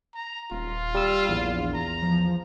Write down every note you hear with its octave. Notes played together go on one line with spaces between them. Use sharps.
A#5
D#1 F4
G3 E6
A#1 E2
A#5
F3